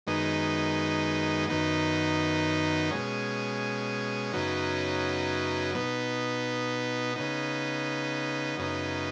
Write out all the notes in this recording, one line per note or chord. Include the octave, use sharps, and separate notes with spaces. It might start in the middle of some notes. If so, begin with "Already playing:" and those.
F#2 D#3 G#3 B3 D#4
F#2 D#3 B3 D#4
B2 G#3 C#4
F#2 C#3 F#3 B3 D#4
B2 B3 D#4
C#3 B3 D#4
F#2 C#3 B3 D#4